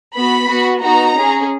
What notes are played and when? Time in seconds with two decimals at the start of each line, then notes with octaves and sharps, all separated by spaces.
0.15 B3 F#4 B5
0.49 B3 F#4
0.82 B3 D#4 F#4 A#5
1.16 C#4 G#4